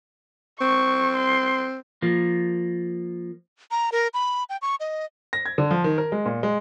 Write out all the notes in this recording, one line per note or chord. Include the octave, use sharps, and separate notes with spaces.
C4 C#6
C6
F3 A#3
A#5
A#4
B5
G5
C#6
D#5
A#6
G#6
D3
F3
D#3
A#4
G#3
A#2
G#3